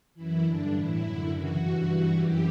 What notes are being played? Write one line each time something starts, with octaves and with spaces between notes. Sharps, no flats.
F#2 E3 E4
G2 D3 D4
A2 E3 E4
F#2 D3
F#2 C#3 E3 F#4
G2 E3
G2 E3
F#2 E3 G4